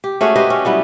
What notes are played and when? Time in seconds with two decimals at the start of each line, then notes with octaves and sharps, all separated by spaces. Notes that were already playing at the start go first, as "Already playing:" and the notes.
0.04 G4
0.21 A3 C#4 F#4 G#4
0.35 G4 B4 C5 D#5
0.50 C#4
0.65 F#3 G3 B3 E4